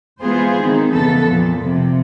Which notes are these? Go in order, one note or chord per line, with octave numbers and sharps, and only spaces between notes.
E3 G#3 B3 F4 G#4 C5
D#3 C4 D#4
D#2 C#3 E3 B3 A4
F2 A#2
C3 F3